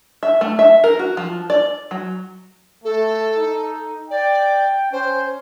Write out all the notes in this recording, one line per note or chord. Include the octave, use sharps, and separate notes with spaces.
E5
A3
E5
A#4
F#4
F3
D5
F#3
A3 A4
D#4
D5 G5
C#4 C5